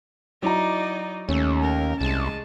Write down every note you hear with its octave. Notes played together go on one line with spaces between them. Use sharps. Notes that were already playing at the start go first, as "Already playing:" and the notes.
F#3 D#4 E4 D5 A#5
D#2 A3 C#4
A#4
C2 G#3 A5